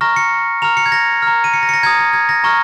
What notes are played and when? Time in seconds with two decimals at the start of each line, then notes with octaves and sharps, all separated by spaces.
0.01 A#5 C#6 F6 A#6
0.16 C#7
0.62 A#5 F6 F7
0.77 C#7
0.86 G#6
0.92 A#6
1.22 A#5 F6
1.44 D#7
1.54 C#7
1.63 A#6
1.69 C#7
1.74 A#6
1.83 A#5 D#6 G#6
1.99 A#6
2.13 G#6
2.29 A#6
2.44 A#5 C#6 F6 A#6